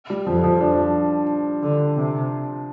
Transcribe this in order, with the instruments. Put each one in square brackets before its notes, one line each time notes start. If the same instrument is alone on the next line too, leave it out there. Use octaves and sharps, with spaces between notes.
[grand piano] G3
[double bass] F2 [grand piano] F3
[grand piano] F3
D4
[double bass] D3
C3